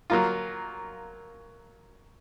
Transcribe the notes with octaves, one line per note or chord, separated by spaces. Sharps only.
F#3 A#3 F4